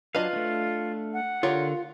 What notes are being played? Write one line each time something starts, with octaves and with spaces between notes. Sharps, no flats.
F#3 D4 F4 B4 D#5 F5
A3 D4
F#5
D3 F4 G4 A#4 C#5